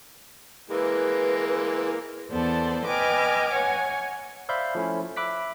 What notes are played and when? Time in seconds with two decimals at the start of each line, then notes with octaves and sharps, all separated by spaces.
0.70 E3 G#3 A#3 B4
2.31 E2 B3 A4 C5 D5 A5
2.86 B4 D#5 G5 G#5 D6 F6
3.51 C#5 F#5 G#5
4.49 C5 D5 E5 F5 B5 G6
4.75 F3 A3 C#4 E4
5.17 E5 B5 D6 F#6 B6